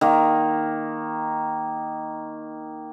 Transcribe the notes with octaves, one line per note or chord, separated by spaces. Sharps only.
D#3 A#3